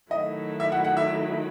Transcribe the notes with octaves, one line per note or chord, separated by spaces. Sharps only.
D#3 F#3 A3 E4 D#5
E5
F#5
F#5
E5